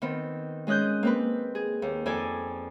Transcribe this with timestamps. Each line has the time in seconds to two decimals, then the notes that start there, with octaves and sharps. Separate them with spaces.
0.02 D#3 B3 C4
0.67 G#3 C#4 D#5 F#6 G6
1.03 A#3 C4 B4
1.55 G#4
1.82 D#2
2.06 F2 A4 D5 G#5